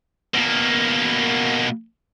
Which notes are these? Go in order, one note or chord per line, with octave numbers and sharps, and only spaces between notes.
B2 A#3